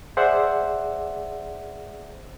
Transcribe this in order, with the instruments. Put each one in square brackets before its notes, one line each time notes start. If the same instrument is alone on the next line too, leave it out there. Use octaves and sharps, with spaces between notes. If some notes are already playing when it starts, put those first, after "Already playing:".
[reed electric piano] G#4 C5 D5 E5 F#5